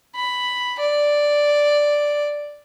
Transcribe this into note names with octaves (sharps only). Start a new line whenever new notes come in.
B5
D5